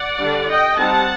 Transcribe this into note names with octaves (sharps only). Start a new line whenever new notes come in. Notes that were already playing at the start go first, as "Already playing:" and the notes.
Already playing: D5 F#5
D3 G3 D4
D#5 G5
G3 C4 D#4 F#5 A5